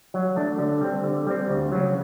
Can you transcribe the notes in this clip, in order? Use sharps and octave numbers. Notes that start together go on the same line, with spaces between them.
F#3
A3 D4
D3
G3 C4
D3
G3 C4
D2
C#3 F#3